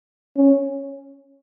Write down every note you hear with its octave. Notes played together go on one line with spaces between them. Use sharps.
C#4